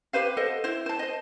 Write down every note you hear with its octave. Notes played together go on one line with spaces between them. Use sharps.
G4 B4 C5 F5
A4 C5 D#5 F#5
E4 C5
C5 A5
C5 D#5